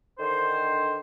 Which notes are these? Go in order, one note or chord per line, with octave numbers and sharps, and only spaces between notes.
D3 D#3 C5